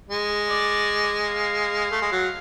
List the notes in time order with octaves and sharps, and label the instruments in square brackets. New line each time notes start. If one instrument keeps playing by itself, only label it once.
[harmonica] G#3
[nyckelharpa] D5
F5
[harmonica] A3
G#3
F#3